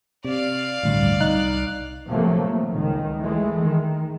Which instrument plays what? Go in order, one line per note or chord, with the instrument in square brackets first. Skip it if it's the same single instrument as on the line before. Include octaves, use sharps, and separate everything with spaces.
[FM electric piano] C3 [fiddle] D5 F5
[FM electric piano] A1 D2 G2
C2 D#4 F#6
[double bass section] C3 F3 F#3 A3 A#3
F3
C#2 D#3
E3 G#3 A3
D#3